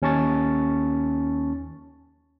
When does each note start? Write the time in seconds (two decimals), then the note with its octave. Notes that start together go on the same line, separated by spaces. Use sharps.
0.02 D#2 C#4 A5 C#6 A6